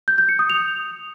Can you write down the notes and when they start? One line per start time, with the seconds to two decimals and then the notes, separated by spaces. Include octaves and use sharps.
0.08 G6
0.18 G6
0.29 C#7
0.39 D#6
0.50 F7